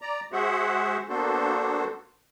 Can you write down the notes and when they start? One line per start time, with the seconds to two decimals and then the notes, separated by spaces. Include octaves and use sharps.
0.01 D5 A#5
0.32 G#3 F#4 G#4 C5 E5 F#5
1.09 A#3 B3 D4 F#4 A4 C5